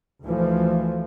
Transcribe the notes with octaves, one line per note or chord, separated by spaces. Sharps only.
D2 D3 E3 F3